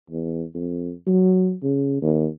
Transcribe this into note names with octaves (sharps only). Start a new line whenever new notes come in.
E2
F2
F#3
C#3
D#2